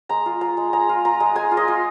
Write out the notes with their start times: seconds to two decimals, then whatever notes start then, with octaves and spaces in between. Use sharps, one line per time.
0.09 G#3 A#5
0.26 F4
0.41 F4 A#5
0.57 G#3
0.73 G#3 A#5
0.89 F4
1.05 F4 A#5
1.20 G#3
1.35 G#3 G#5
1.51 F4
1.57 D#5
1.68 F4